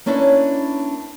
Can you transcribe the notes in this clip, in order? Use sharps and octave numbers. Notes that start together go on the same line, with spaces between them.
A#3 C#4 D4 E4 B4 C#5